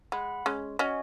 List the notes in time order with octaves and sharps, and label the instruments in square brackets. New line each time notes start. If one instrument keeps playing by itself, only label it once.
[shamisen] G#3 [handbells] F#5 B5
[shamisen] G#3 C#4
[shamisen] C#4 F#4 [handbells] D#5 G#5